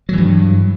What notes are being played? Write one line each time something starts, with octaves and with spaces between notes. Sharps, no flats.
G2 E3 F#3